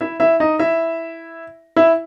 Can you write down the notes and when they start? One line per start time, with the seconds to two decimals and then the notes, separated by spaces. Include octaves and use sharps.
0.01 E4 E5
0.20 E4 E5
0.40 D#4 D#5
0.59 E4 E5
1.76 E4 E5